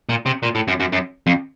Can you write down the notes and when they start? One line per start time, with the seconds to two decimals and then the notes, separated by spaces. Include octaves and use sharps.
0.09 A#2
0.26 C3
0.43 A#2
0.55 A2
0.68 F#2
0.80 F#2
0.93 F#2
1.27 F2